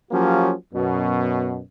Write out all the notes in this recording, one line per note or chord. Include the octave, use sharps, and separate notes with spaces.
F3 F#3 A#3 C#4 F#4 G4
F#2 B2